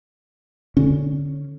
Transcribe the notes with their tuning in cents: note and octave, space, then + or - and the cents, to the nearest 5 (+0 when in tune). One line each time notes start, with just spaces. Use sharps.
D3 -15 C#4 +0